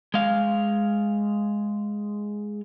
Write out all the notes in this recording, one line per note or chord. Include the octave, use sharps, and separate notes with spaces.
G#3 F5